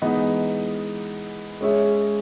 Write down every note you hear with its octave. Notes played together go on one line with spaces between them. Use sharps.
E3 G#3 B3 D#4
G#3 C#4 G#4 C#5 E5